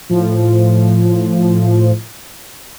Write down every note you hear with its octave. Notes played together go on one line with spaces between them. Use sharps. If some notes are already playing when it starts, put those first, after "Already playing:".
A2 F3